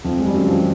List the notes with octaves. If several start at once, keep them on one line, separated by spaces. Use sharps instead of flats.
F2 F3
G#3
G3
F#2 F#3
F3
E3